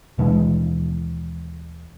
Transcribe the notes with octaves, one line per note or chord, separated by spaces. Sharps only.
D#2 B2 E3 G#3